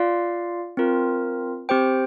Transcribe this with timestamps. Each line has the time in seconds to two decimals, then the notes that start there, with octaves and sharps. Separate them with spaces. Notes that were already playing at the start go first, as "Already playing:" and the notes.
Already playing: F4 D5 F5
0.77 C4 F4 A#4
1.69 C4 G4 C5 G5